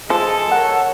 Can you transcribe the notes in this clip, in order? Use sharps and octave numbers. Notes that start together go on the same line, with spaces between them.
F3 G#3 A4
A#4 C#5 F#5